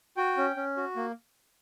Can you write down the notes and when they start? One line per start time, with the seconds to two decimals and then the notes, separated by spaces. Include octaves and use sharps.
0.17 F#4 G5
0.37 C#4
0.56 C#4
0.77 F#4
0.96 A#3